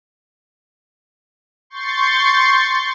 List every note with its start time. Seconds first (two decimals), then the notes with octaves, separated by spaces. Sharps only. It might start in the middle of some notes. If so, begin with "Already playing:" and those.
1.70 C6 C#6 G6 A6 C7